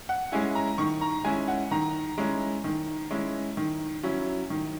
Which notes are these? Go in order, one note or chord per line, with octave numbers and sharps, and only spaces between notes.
F#5
G#3 C#4 E4 G#5
A#5
D#3 C#6
A#5
G#3 C#4 E4 G#5
F#5
D#3 A#5
G#3 C#4 E4
D#3
G#3 C#4 E4
D#3
F#3 C#4 E4
D#3